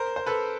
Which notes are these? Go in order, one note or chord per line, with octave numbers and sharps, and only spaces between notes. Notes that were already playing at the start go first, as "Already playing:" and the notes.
Already playing: A#4 C5
C5
A4 B4